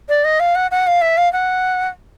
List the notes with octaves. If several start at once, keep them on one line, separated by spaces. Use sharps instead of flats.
D5
D#5
F5
F#5
F#5
F5
E5
F5
F#5